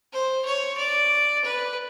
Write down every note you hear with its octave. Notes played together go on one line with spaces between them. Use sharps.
C5
C#5
D5
B4